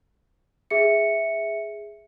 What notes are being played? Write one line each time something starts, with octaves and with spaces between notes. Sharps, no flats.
G#4 E5 C#7